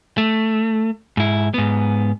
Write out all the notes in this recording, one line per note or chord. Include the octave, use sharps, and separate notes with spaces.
A3
G#2 E4
G#2 B3